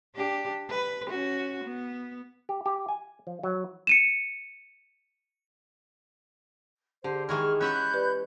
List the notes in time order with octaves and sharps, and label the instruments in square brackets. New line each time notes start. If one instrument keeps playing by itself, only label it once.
[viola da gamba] D4 G4
B4
C#4 F#4
B3
[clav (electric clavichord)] G4
G4
G#5
F3
F#3
[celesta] C#7 D#7 E7
[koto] D3 [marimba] G4 [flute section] C5
[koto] D#3 E3 G#3 [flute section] C#6 F6
[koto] C#4 E5 F#5 [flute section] B5 F#6 G6
[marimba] G4 B4 D5